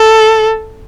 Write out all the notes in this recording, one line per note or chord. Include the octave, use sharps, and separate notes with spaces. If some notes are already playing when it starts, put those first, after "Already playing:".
Already playing: A4